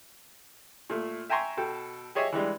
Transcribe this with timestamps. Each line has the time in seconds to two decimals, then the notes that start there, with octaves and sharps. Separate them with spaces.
0.90 A#2 A3
1.30 E5 G5 G#5 A#5 C6 C#6
1.57 B2 A4 G5
2.15 G4 G#4 C#5 D#5 E5 G#5
2.32 E3 G3 G#3 D4